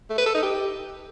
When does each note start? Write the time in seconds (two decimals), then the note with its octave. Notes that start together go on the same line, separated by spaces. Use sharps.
0.10 A3
0.18 B4
0.26 A4
0.34 D#4
0.42 G4